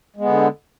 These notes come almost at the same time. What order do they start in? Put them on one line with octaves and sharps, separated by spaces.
G#3 B3 D3